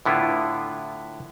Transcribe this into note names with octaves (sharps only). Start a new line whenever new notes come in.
A2 D3 B3 E4 F4